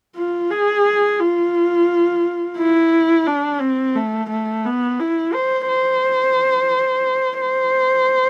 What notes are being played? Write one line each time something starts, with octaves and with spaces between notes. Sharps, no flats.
F4
G#4
F4
E4
D4
C4
A3
A3
B3
E4
C5
C5
C5